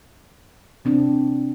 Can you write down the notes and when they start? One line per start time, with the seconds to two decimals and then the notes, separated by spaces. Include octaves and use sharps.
0.85 C3 C4 D4